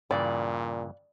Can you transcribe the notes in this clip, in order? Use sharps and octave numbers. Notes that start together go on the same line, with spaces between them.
G2 A#2 C#3 E3 D5